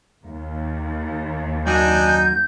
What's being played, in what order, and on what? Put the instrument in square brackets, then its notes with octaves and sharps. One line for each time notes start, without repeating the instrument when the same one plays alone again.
[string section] D#2
[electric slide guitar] F#2 F#4 [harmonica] D4 D#4 G#5 [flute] G6